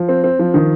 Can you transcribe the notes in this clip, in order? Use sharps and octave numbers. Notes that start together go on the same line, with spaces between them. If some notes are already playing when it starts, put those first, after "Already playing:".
Already playing: F3
C4
C4
F3
D#3